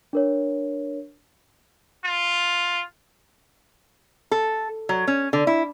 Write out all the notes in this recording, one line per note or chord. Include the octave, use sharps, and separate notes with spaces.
D4 A#4 C#5
F4
A4
F#3
C#4
D3
E4